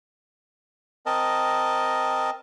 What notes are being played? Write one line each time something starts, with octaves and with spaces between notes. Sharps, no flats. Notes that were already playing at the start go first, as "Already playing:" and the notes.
C4 A#4 D#5 A5